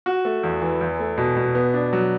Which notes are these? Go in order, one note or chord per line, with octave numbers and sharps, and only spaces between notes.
F#4
A3
E2
E3
E2
A3
B2
B2
B3
D4
F#3